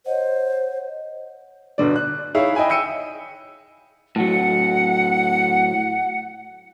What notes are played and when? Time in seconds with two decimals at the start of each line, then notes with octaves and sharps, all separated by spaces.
0.06 C5 C#5 D#5 F#5
1.78 G1 B2 D3 D5
1.96 F#6
2.34 D#4 E4 G#4 C#5 E5 F5
2.55 D#5 E5 G5 G#5 B5
2.69 G5 E6 C#7 D#7
4.16 A2 F#3 F#5